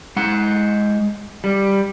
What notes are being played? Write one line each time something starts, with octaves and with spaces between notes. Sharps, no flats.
G#3 F#5
G3